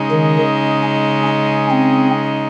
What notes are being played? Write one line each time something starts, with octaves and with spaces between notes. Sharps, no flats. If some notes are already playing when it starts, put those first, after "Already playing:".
Already playing: C#3 G#3 D#4
D#3
C#4
C#4
C4